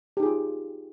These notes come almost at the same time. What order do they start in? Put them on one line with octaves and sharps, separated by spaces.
G4 D#4 G#4 F4